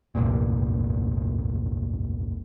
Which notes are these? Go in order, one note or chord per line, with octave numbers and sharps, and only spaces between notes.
F1 C2 G2 A#2